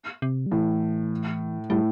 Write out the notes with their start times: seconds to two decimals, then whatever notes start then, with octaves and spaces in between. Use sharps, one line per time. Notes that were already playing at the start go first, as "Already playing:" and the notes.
0.22 C3
0.46 G3
0.52 A2 E3
1.70 A2 G3